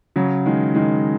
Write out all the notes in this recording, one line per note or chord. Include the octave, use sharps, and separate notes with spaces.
C#3 F#3
D#3 G#3
D#3 G#3